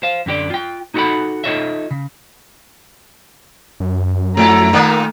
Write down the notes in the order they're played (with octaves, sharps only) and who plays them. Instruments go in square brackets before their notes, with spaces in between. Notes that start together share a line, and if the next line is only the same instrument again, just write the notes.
[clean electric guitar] C5 F5
F#2 D3 G4 D5
F4 G5
D#4 F#4 A4 C#5 F#5 B5
D#4 F4 A4 C#5 D#5 E5
C#3
[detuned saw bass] F#2
[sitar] F3 E4 A4 [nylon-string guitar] A3 [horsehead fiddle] A#5
[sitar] A#2 D#3 A#3